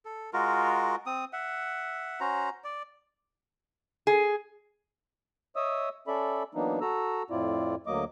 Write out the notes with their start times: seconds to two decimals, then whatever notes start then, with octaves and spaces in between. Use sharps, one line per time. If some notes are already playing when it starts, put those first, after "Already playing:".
0.05 A4
0.33 G#3 F4 F#4 A#4
1.06 C4 D#6
1.33 E5 F#5
2.20 C#4 F#4 C5 A#5
2.64 D5
4.07 G#4
5.56 C#5 D#5 E5 D#6 E6
6.07 C#4 A4 D5 E5 B5
6.55 E3 F#3 A#3 B3 D4 D#4
6.81 F#4 A4 A#5 E6
7.30 F2 A2 C4 E4 F4 D5
7.87 D2 F#3 A#3 D#5 D6